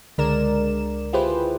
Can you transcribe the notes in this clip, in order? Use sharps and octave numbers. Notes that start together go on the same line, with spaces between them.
C#2 D3 G#3 A#4 D5 E7
E4 F4 G4 G#4 B4 C5